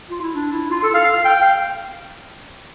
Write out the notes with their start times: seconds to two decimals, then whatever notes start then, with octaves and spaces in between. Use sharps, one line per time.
0.10 F4
0.22 E4
0.35 D4
0.52 E4
0.71 F4
0.83 A4
0.94 F5
1.06 F5
1.25 G5
1.42 F5